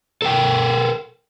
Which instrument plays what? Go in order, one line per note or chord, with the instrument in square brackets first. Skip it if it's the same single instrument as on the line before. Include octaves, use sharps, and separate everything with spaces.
[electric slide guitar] A4 A#4 F5 G5